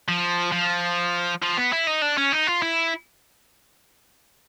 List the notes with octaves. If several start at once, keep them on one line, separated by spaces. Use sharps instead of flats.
F3
F3
F3
B3
E4
D#4
D4
C#4
D#4
F4
E4